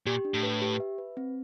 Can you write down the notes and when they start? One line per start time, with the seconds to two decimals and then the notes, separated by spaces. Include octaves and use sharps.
0.06 A#2 G4
0.25 D4
0.34 A2
0.43 B4
0.61 G4
0.80 E5
0.98 B4
1.17 C4